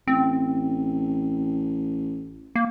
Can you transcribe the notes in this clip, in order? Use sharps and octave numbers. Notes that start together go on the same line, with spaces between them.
A1 C4
A#3